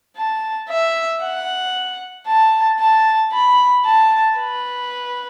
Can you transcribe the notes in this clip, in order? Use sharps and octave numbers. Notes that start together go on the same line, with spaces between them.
A5
E5
F#5
A5
A5
B5
A5
B4